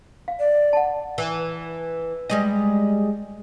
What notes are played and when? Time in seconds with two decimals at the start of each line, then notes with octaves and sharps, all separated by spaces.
0.28 F5
0.39 D5
0.73 F#5 A5
1.18 E3
2.30 G3 G#3 D#5